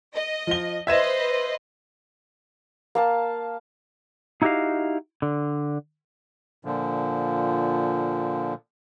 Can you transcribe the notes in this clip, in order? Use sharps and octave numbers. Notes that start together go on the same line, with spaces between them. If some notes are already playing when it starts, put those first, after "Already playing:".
D#5
F3 G7
B4 C5 D#5 E5 G#6 E7
A#3 F5 A5
D#4 E4 F#4 G4 D#5 F5
D3
A#2 D3 F3